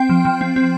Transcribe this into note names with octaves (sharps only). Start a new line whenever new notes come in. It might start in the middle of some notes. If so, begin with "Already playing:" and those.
Already playing: C4 G5
F3
F3
C4
C4